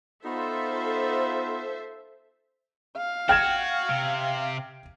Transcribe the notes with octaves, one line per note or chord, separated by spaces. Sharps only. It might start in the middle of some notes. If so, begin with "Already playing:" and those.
B3 D#4 F4 A4 C5 E5
F5
F#4 G5 F6 G#6 E7
C3